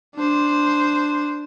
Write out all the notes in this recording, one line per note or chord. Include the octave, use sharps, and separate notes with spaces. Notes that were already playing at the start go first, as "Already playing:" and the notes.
D4 C5